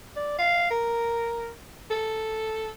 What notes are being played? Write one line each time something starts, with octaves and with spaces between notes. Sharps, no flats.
D5
F5
A#4
A4